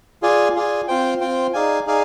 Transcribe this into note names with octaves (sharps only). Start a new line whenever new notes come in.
F4 G#4 D5 G#5
F4 G#4 D5 G#5
C4 F4 C5 G5
C4 F4 C5 G5
D#4 G#4 D5 F5 G#5
D#4 G#4 D5 F5 G#5